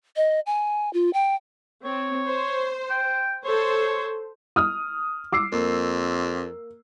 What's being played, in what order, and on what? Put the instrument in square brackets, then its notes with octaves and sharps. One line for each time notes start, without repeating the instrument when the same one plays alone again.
[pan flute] D#5
G#5
F4
G5
[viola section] C4 [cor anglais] C#5
[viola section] C5
[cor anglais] G5
[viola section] A4 C5 [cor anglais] C#5
[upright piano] D#6 F6
D6 E6 C7
[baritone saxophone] F2 [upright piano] A#3